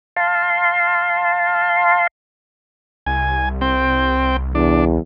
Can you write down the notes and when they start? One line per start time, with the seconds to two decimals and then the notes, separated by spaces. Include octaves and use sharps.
0.16 F5 A5 C6
3.06 C2 G#5
3.61 C4 G5
4.55 E2 D4